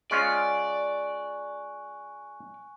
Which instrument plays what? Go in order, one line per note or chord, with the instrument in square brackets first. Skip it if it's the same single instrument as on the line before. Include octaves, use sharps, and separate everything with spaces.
[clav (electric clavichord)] G#3 C#4 F4 [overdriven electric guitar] D5 [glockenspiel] G#5 C#6 F#6